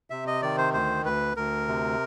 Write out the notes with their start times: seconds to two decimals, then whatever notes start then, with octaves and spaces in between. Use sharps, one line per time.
0.10 C3 E5
0.27 D#5
0.42 D#3 D5
0.58 C5
0.74 D2 C5
1.05 D2 B4
1.37 D2 A#4
1.68 C3